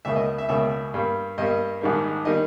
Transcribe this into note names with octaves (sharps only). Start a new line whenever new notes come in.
C#2 B2 A#3 E5
D#5
E5
C#2 B2 A#3 E5
G2 G3 A#3
G2 G3 A#3 D#5
A#1 G#2 D#3 G3 A#3
D#3 G3 A#3 D#5